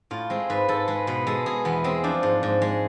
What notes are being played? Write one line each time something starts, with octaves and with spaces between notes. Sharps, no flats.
A2 F4
G#3 C4
G#2 B4
G#2 A4
G#3 B4
B2 B4
G#3 A4
B2 G#4
E2 B3
G#3 C4
F3 D4
G#2
G#2
G#3